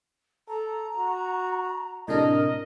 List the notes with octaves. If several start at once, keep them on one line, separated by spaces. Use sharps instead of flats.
A4 A#5
F#4
A2 C3 D4 A#4 D#5